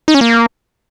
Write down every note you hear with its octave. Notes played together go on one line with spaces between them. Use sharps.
D#4
C#4
A#3